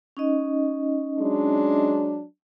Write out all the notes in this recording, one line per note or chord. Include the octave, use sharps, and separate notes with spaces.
C#4 D#4 D#5
F#3 G#3 D4